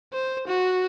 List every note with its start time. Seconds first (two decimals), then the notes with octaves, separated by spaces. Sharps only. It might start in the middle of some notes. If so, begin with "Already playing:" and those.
0.13 C5
0.48 F#4